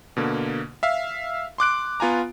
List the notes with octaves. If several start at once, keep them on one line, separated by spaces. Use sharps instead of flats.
B2 D3 A#3
E5 F5
C6 D6 F#6 D7
B3 F4 G#5 A#5